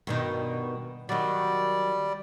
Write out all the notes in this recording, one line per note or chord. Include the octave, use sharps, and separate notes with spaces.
G2 B2 D#3
D#3 F#3 G3 D5